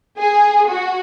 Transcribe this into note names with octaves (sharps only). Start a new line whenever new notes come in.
G#4
F#4